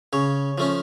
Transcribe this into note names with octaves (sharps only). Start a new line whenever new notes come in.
C#3 C#5
F3 A3 C#4